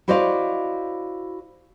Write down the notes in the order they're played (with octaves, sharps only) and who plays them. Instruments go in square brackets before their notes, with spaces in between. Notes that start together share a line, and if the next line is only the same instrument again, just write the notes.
[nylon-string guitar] E4 F#4 C5 D5 D#5 F5